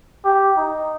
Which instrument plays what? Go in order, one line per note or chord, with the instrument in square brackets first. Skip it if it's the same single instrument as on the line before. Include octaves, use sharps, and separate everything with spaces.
[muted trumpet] G4
D#4